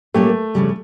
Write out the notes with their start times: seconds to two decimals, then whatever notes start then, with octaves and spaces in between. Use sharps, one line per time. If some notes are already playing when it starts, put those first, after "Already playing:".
0.14 A#2 G3 A3 A#3 C#4 G4
0.55 F2 C#3 G3